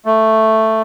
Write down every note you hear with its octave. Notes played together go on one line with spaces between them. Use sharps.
A3